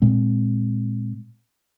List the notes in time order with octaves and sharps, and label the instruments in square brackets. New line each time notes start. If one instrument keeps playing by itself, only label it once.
[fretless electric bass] A#2 G#3 C4